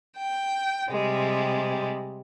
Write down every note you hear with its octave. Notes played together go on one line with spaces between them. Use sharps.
G5
C3 G3 G#3